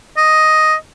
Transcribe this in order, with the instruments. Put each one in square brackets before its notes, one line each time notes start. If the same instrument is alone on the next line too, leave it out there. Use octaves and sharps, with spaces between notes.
[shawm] D#5